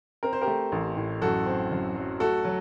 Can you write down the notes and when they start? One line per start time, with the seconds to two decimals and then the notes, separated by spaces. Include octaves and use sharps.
0.23 C4 A#4
0.33 C5
0.41 G4 A#4
0.47 A3
0.72 A1
0.97 A2
1.22 F#2 F#4 A4
1.46 C4
1.72 F#2
1.96 F#3
2.20 A3 F#4 A4
2.45 F#3